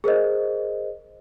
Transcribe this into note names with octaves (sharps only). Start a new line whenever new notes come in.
G#4 A#4 C5 D#5